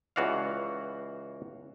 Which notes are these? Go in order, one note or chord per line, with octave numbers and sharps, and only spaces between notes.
C#2 E3 F#4 D5 F5